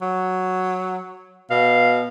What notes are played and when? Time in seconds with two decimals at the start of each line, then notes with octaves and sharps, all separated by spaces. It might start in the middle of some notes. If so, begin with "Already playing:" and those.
0.02 F#3
1.51 B2 F5